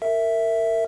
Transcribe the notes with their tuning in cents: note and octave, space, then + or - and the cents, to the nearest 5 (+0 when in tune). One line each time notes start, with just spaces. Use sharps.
A#4 -25 E5 +0